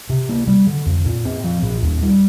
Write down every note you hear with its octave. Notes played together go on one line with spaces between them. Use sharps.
C3
A#3
G3
D3
F2
A#2
C4
F3
A#2
D#2
G3